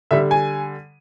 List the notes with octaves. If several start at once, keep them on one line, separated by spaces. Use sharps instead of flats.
D3 G3 E5
G#5